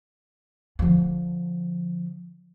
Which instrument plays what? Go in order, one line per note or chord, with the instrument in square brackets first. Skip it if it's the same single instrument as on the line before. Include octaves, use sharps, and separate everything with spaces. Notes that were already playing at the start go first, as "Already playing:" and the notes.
[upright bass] D3 F3